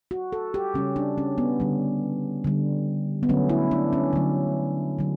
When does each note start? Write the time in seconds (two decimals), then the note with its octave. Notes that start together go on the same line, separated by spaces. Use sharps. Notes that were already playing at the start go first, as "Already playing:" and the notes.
0.11 F#4
0.33 A4
0.54 G4
0.74 C#3 G3 C#4
0.96 D4
1.18 C#4
1.38 B3
1.60 D3 G3
2.44 D3 G3
3.23 B3
3.29 D3 F#3 A3 C#4
3.49 E4
3.71 D4
3.93 C#4
4.13 D3 F#3 A3
4.99 D3 F#3